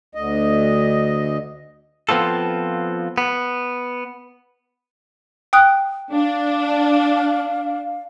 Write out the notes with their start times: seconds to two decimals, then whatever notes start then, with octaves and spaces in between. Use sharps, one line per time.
0.15 D2 D#5
2.09 F3 B3 C4 F4 A4
3.18 B3
5.53 G5 D#6 F#6
6.12 D4 F5